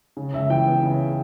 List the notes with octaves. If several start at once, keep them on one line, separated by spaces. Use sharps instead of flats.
C#3
C#2 E5
E3 G5
B3
C#3